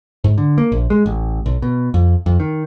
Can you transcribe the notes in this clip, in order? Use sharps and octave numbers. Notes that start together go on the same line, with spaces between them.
G#2
D3
A#3
A#1
G#3
A1
B1
B2
F2
F2
D#3